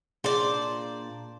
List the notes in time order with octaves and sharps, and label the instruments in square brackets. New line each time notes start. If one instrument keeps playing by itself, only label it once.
[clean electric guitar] A#2 D4 F4 [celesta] G#4 [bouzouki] C5 D5